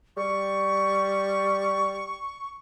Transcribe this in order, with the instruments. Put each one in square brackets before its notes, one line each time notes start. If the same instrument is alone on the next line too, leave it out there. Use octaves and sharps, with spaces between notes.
[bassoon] G3 [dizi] C#6